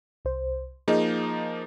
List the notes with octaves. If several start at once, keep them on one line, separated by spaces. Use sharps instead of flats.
C2 C5
F3 A#3 D#4 G#4 D#5